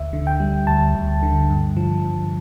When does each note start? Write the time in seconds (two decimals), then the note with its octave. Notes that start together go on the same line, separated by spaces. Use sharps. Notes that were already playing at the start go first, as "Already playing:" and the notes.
Already playing: D2 E5
0.13 D3
0.27 G5
0.40 G3
0.67 D2 A5
0.95 D2
1.23 D3
1.50 G2
1.77 F3
2.05 G2